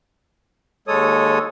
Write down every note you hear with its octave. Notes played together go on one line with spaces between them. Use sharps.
D#2 G#3 A4 C#5 D#6